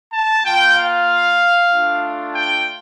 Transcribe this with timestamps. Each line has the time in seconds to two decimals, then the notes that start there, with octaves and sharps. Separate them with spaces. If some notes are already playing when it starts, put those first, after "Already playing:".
0.13 A5
0.44 A#3 F4 G5
0.75 F5
1.70 A3 D4 F4
2.33 G5